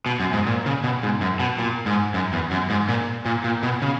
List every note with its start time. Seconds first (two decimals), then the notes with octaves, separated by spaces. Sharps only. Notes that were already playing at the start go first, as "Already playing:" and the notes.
0.06 B2
0.20 F#2
0.33 G#2
0.47 A#2
0.66 C#3
0.84 B2
1.03 G#2
1.21 F#2
1.40 B2
1.58 A#2
1.86 G#2
2.14 F#2
2.33 E2
2.51 F#2
2.70 G#2
2.89 A#2
3.26 A#2
3.44 A#2
3.63 B2
3.82 C#3